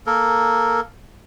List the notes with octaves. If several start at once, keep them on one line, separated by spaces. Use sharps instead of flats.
A#3 A4 A#4